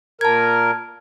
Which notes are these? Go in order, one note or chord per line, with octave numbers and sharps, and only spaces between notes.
A#2 A#4 A5 G#6